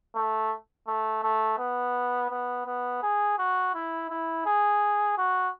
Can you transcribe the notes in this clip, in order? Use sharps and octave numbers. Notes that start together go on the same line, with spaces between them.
A3
A3
A3
B3
B3
B3
G#4
F#4
E4
E4
G#4
F#4